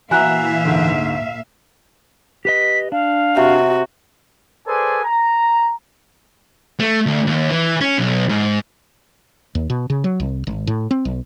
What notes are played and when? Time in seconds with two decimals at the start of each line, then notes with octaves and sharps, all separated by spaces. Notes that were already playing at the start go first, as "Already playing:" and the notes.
0.11 A#2 E3 F#4 E5 F5 G#5 A#5 F#6
0.65 D2 G#2
2.45 G4 B4 D#5 B6
2.92 D4 F5
3.37 C3 F#4
4.67 G#4 A4 B4 C5 D5 G#5
5.04 A#5
6.80 A3
7.06 D2
7.27 D#2
7.50 E3
7.81 C#4
7.98 B1
8.29 G#2
9.55 D#2
9.70 B2
9.90 C#3
10.04 F#3
10.20 C2
10.47 G#1
10.67 A2
10.91 C4
11.05 B1